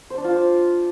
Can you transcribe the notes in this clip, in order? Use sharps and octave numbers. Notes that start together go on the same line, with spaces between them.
C5
D4
F4
C5